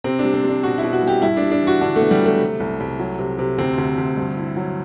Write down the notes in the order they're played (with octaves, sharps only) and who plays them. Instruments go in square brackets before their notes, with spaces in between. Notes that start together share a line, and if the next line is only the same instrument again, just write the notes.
[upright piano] C3 [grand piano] C4
[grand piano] D4
[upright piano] G3
[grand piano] C4
[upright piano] G3
[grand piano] D4
[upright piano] B2 [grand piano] F#4
[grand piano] E4
[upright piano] B2
[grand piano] F#4
[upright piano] G3
[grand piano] G4
[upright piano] G2 [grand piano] E4
[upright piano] G3 [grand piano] D4
[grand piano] D4
[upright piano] E3
[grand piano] F#4
[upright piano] D3 [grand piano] D4
[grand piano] A3 [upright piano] B3
[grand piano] G3
[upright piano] F#3 [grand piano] A3
[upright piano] C3
C2
C2
F#3
C3
C3
[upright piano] D2 [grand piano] C4
[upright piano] D2
D2
G2
E4
F#3